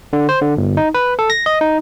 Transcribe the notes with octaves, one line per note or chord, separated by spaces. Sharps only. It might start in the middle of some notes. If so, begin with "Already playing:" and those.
D3
C5
D3
G1
D#4
B4
A4
A#6
D#5
D#4